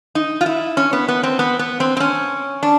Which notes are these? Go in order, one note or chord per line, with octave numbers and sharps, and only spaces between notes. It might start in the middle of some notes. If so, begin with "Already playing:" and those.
D#4
F4
E4
C#4
B3
B3
C4
B3
B3
C4
C4
C#4
D4